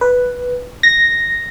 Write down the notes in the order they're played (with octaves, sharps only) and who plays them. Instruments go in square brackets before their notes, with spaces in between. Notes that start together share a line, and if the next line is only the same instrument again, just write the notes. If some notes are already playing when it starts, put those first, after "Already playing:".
[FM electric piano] B4
A#6